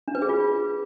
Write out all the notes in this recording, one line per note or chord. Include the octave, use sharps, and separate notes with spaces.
D4
B4
G#4
F4